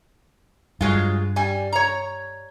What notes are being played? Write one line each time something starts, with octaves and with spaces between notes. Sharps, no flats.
G2 F#3 G#3 F4
G3 G#5
C#5 A#5